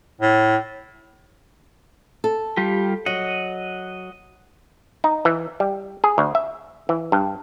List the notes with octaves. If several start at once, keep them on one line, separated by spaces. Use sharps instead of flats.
A2
A4
G3 F4 G4
F#3 D#5 F#5
D#4
E3
G3
G#4
D2
E5
E3
G2